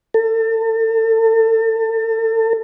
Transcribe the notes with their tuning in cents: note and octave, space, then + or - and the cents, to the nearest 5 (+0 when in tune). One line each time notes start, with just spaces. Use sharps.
A4 +35